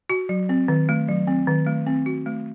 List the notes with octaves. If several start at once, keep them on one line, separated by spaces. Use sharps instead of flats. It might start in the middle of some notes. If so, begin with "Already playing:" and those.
F#4
F#3
C4
D#3
A3
F#3
C4
D#3
A3
C4
F#4
A3